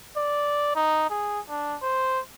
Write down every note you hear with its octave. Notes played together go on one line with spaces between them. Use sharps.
D5
D#4
G#4
D4
C5